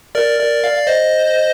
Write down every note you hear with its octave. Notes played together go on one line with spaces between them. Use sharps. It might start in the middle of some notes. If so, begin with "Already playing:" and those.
A#4 D5
A#4 D5
D5 F5
F5
C5 D#5